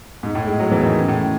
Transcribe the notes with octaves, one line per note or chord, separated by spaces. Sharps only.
G#2
A2
G#3
F#3
E3
D#3
C#3
A2